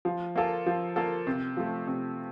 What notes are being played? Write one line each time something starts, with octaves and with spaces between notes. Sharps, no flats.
F3
A#3 F4 A4
F3
A#3 F4 A4
C3
F3 A3
C3